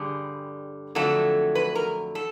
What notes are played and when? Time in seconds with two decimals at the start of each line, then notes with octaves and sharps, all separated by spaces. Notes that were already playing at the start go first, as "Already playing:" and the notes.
Already playing: G2 D3 G3 G#4
0.95 F2 D3 F#3 A3 A4
1.55 B4
1.75 A#4
2.15 A4